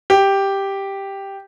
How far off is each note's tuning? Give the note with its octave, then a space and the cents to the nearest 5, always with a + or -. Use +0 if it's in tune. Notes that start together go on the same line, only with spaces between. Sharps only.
G4 +0